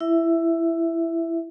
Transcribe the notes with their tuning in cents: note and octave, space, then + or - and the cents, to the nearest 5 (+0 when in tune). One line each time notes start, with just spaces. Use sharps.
E4 +15 E5 +0